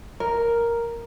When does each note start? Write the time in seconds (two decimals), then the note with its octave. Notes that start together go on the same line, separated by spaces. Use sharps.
0.20 A#4